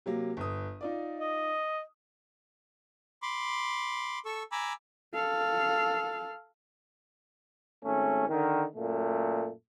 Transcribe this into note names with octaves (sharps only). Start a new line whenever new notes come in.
C3 F#3 A#3
G1 D#6
D#4 F4 D5
D#5
B5 C6 D6
A4 C#6 E6
G#5 A#5 B5 D6 E6
A4 F5
G#1 A3 C#4
D3 D#3
F#2 A#2 A3